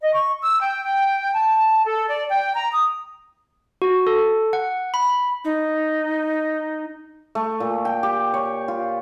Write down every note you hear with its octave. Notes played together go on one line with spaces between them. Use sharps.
D#5
C#6
E6
G5
G5
A5
A4
D5
G5
A#5
D#6
F#4
A4
F#5
B5
D#4
A3
A#2
G5
G4
C#5
F4